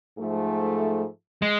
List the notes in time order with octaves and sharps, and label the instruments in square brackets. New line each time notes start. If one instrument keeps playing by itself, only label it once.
[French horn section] G#2 F3 A3
[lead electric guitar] G#3